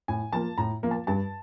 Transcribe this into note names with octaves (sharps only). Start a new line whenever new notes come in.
A2 G#5
F3 A#3 A5
A2 A#5
F3 A#3
A5
G2 A5